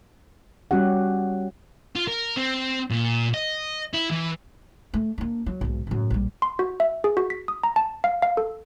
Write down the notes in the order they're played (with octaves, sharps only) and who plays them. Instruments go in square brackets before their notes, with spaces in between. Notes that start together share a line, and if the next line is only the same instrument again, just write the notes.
[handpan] G3 C#4 F#4 G4 F#5
[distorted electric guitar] F4
A#4
C4
A#2
D#5
E4
E3
[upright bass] A3
A#3 D4
F#3
B1 G#2
F#2 A2
A#1 G3
[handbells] C6
F#4
E5
G#4
F#4
B6
D#6
A#5
A5
F5
F5
A4